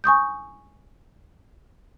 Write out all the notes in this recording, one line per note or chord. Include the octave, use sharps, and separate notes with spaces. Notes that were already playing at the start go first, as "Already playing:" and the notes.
G#5 C#6 D#6 G6